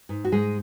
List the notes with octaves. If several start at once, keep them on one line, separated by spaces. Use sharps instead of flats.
G#2
F#4
G#2 G#3 G#4